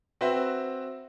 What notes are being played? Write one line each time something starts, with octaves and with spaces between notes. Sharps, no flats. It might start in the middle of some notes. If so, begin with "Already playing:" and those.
C4 F#4 B4 C5 E5